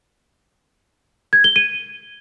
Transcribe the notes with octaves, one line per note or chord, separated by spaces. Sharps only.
G#6
G7
D#7